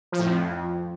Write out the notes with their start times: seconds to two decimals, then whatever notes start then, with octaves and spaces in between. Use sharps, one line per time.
0.12 F3
0.19 A2
0.26 F2